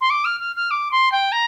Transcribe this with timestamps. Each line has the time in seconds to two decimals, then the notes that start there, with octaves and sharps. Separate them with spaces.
0.01 C6
0.10 D6
0.25 F6
0.40 F6
0.56 F6
0.71 D6
0.92 C6
1.12 G5
1.32 A#5